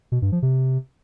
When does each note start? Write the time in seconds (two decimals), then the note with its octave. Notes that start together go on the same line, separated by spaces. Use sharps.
0.12 B2
0.22 G2
0.32 F3
0.42 C3